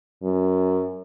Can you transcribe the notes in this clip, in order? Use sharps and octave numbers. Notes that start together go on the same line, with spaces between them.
F#2